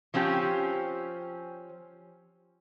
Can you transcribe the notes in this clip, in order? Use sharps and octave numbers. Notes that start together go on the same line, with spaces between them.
F3 C4 C#4 G4